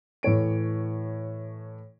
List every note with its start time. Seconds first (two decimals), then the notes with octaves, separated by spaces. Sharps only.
0.23 A2 E3 C#5 D7